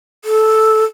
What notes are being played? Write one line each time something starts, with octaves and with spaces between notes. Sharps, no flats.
A4